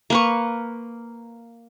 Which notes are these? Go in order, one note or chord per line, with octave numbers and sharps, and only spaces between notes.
A#3 B4 C#6